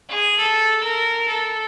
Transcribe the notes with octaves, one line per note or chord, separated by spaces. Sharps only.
G#4
A4
A#4
A4